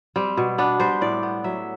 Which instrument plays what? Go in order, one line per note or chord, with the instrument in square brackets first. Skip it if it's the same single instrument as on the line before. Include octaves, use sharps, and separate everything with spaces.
[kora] G3 C4
B2
B3 D4
G3 C5
A2 D5
B3
F#3 E5